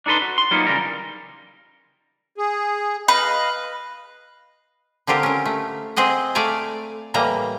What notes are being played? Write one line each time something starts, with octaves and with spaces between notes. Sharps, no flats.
D4 D#4 A4 B4 C6
F#4
C6
F#3 G3 A#3 B3 D#4 F4
C#3 E3 G3 A#4
G#4
B4 D#5 F5
D3 C4 F4 G4 A#4
C#4 A#4
A3
C4 G#4 D#5 F#5
A3 D5 F5 G#5 A#5
A2 E3 G3 A#3 D#5 A#5